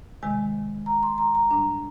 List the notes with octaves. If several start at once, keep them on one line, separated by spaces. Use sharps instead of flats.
C3 D#3 G#3 G#5
A#5
C6
A#5
A#5
G#2 G3 D4 A#5